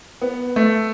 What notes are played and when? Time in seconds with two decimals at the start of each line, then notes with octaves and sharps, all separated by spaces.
0.22 B3
0.56 A3